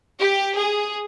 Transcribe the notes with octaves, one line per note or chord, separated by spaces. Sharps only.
G4
G#4